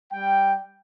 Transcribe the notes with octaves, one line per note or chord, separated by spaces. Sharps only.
G3 G5